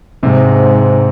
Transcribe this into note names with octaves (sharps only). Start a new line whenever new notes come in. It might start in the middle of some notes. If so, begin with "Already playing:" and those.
G#2 C3